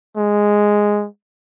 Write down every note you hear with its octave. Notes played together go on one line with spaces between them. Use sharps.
G#3